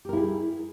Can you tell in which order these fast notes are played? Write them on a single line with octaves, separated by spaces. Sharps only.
G4 A#4 E4 G#4